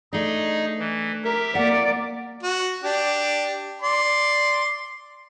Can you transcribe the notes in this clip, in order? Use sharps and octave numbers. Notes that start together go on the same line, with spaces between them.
A3 D4 D#4 G#4 D#5
E3
G4 A#4 E5
A#3 D5 F#5
F#4
D4 G4
D5 C6